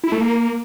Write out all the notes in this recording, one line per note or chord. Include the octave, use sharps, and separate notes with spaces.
E4
A3
A#3